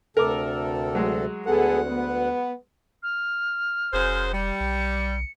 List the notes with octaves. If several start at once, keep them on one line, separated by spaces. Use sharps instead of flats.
D2 C3 A4 A#4 D6
F#3 G#3
D2 B3 G#4 A4 F#5
B3
F6
F1 F#2 G#4 C5
G3 C#7
B1